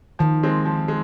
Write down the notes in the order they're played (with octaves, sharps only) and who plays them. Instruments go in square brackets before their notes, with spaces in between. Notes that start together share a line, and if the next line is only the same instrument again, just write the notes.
[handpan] D#3 [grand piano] F3
[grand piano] G#3 C4
F3
G#3